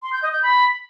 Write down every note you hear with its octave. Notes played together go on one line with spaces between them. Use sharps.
C6
G6
D#5
G6
B5